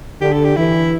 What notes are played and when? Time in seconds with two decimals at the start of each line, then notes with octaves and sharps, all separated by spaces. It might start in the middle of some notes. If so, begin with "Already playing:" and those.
0.21 D3 G4
0.32 A4
0.45 G4
0.56 E3 E4